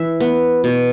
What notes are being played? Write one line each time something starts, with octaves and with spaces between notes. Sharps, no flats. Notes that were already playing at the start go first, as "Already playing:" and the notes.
Already playing: E3 E5
B3
B2